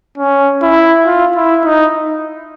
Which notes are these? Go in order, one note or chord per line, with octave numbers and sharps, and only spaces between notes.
C#4
E4
F4
E4
D#4